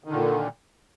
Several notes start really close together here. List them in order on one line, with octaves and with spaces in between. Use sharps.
D#3 D3 A#2